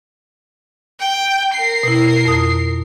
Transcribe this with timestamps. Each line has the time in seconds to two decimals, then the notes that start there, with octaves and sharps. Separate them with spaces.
1.00 G5
1.53 A#4 C7
1.83 B2 E4
2.25 F2 D#6